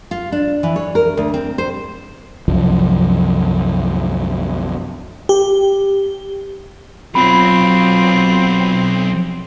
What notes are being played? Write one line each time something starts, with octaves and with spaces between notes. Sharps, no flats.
F4
D4
E3
C#5
A#4
D2
C4
C5
C2 F#2 F3
G4
B1 F#3 C4 F4 B5